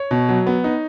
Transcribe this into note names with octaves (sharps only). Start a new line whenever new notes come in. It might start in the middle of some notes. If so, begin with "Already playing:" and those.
Already playing: C#5
B2
F#3
B3
D#4